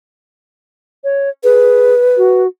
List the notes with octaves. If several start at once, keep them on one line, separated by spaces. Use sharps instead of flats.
C#5
G#4 B4
F#4